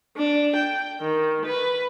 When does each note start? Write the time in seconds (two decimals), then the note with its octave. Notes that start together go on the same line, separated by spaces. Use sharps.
0.17 D4
0.56 G5
1.01 D#3
1.45 B4